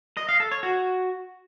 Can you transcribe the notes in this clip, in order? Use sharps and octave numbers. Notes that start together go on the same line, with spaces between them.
D#5
F5
A4
C#5
F#4